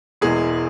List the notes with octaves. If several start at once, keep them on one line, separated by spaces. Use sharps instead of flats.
E1 E2 E3 G#3 G#4